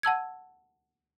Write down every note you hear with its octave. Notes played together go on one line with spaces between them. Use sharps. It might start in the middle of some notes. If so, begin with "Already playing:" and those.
F#5 A5 E6 G#6